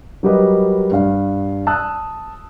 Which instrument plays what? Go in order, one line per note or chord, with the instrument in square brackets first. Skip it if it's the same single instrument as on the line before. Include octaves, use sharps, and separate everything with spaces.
[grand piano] F#3 G3 G4 A#4 B4 D#5
G2 F5
A5 D#6 E6 F#6